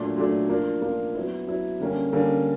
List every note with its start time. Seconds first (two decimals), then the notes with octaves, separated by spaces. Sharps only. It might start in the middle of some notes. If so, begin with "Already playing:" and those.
Already playing: A#2 F#3 A3 D4
0.17 A#2 F#3 A3 D4
0.49 F3 A#3 D4
0.82 F3 A#3 D4
1.15 F#3 B3 E4
1.48 F#3 B3 E4
1.80 D3 G3 A#3 C#4
2.13 D3 G3 A#3 C#4